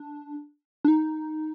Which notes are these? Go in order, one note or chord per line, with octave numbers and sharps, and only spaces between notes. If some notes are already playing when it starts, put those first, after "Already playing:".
Already playing: D4
D4
D#4